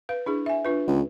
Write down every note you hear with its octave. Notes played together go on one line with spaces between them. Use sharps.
B4 F5
D4 E4 G#4
E5 G#5
D4 F4 B4
C#2